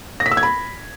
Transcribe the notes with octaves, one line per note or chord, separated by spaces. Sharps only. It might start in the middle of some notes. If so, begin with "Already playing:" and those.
A#6
B6
E6
G#6
B5